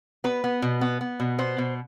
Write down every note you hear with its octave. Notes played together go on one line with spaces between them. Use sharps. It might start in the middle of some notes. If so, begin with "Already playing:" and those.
B3 B4
B3
B2
B3
B3
B2
B3 C5
B2